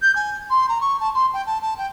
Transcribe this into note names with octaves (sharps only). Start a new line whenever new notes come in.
G6
G#5
C6
A#5
C#6
A5
C6
G5
A5
A5
G5